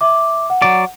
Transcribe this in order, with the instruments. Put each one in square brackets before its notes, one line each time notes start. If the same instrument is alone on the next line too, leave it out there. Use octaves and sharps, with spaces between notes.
[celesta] E5 D6
F#5
[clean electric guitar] F#3 D5